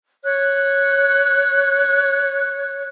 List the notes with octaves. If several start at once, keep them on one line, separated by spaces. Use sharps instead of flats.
C#5 F#6